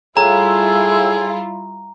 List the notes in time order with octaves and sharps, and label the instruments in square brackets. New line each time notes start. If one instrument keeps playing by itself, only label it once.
[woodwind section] A2 E6 [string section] G3 E4 F4 [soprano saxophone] G#4 [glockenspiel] A#5